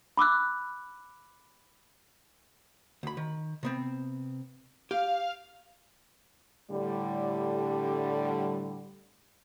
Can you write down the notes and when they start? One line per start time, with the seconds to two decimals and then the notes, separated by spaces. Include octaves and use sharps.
0.17 B5 D6 E6 F#6
3.03 D2 B5
3.17 D#3
3.63 C3 B3 C4
4.91 G4 F5
6.71 A2 D3 G3